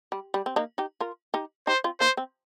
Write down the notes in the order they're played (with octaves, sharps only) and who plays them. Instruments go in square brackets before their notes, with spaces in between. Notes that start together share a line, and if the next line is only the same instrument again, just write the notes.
[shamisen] G3
G3
C4
A#3 D#4
D#4 G4
F4 A#4
D#4 G4
[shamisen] D#4 G4 [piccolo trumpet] C5
[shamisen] C4 F4
[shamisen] A#3 D#4 [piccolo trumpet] C5
[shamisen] C4